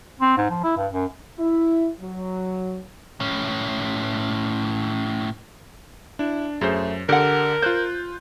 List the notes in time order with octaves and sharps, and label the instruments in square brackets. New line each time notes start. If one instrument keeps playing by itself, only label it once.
[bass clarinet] C4
G#2
F3
E4
G2
F#2
[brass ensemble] E4
F#3
[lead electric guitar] A2 C#4
[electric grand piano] D4 [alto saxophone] E4
[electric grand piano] F#2 [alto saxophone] A3 [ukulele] G#4 C5
[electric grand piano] D3 [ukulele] G4 F#5 [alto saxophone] A#4
[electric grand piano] F4 F#6 G6 [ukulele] C5